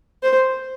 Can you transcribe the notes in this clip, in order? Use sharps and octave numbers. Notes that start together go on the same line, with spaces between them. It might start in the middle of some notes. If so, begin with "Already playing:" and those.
C5